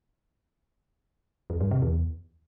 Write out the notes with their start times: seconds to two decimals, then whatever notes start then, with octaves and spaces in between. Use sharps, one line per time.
1.50 F2
1.61 G2
1.71 C3
1.82 E2